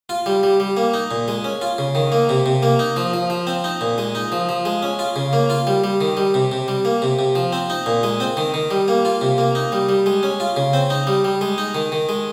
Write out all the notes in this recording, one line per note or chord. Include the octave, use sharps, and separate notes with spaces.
F4
G3
G3
G3
A#3
D#4
A#2
G#3
C#4
F4
C#3
D#3
A#3
C3
C3
A#3
D#4
F3
F3
F3
C4
D#4
A#2
G#3
D#4
F3
F3
G#3
C#4
F4
C#3
A#3
F4
G3
G3
D#3
G3
C3
C3
G3
A#3
C3
C3
F3
C4
D#4
A#2
G#3
C4
D#3
D#3
G3
A#3
F4
C3
A#3
D#4
G3
G3
G#3
C#4
F4
C#3
C4
D#4
G3
G3
G#3
D#4
D#3
D#3
G#3